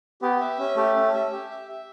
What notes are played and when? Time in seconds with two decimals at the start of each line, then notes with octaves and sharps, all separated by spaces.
0.22 B3 G4
0.41 E5
0.58 C#4
0.77 A3 G4
0.96 C#4
1.14 E5
1.32 G4
1.51 E5
1.69 E5